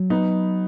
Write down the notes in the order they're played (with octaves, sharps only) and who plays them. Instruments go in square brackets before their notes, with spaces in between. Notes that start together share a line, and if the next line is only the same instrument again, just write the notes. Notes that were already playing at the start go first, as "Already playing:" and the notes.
Already playing: [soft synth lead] F#3
[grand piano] B3 D#4